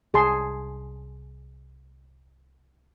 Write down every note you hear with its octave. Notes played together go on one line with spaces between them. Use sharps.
C2 G#4 A5 C6